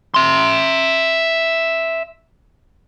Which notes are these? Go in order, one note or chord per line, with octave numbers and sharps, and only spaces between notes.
E5 C6